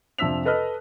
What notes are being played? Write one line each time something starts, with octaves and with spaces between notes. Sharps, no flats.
F2 C3 D4 E6 B6 F7
A4 B4 D#5 F6 F#6